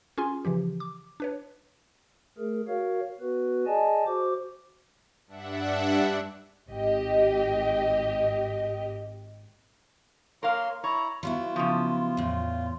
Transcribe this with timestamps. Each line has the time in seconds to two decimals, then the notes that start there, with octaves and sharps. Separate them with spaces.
0.18 C#4 F4 G#4 G#5 C6
0.45 C#3 E3 F3 G4
0.80 D6
1.20 D4 B4 C#5
2.38 A3 G#4 A#4
2.68 F#4 A#4 C#5 F5
3.21 B3 F#4 B4
3.66 G#4 D5 D#5 G#5 A5
4.06 F#4 C5 D6
5.27 G2 D4 E5 F#5
6.70 G#1 G4 D#5
10.43 A#3 A#4 C#5 F5 C6
10.84 E4 C#5 A#5
11.23 F#3 B3 E4 F4
11.56 C#3 F3
12.17 E2 A2